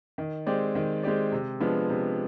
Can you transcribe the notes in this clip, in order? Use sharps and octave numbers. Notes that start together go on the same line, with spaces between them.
D#3
G#3 C4 G4 D5
D#3
G#3 C4 G4 D5
C3
F3 G#3 B3 D4
C3